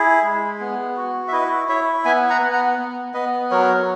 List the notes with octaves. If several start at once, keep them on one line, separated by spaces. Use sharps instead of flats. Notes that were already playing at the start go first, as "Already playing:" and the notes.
Already playing: E4 G#4
G#3
B3
F#4
E5
E4 B4 D#5
E4 C#5 E5
B3 E5 G#5
F#5 A#5
B3
F#5 A#5
B3
B3 B4 D#5
F#3 A#4 C#5